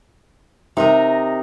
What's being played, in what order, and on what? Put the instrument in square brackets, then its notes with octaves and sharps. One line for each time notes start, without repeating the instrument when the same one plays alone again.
[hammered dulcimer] C3 [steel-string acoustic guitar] D#4 A#4 D#5